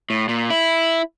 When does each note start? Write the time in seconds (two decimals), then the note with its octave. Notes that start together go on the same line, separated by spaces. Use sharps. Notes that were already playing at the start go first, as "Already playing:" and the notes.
0.10 A2
0.29 A#2
0.50 E4